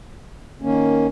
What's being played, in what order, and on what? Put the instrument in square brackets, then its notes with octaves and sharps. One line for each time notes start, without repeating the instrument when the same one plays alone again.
[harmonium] D#3 A#3 C#4